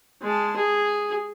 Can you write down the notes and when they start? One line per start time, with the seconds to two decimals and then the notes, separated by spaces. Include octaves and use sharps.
0.22 G#3 A5
0.56 G#4